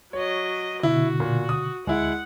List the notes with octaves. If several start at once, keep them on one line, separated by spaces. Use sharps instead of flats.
F#3 C#5 D#5
B2 D3 E4 F#4
A#2
D#6
D2 G#3 E4 F#5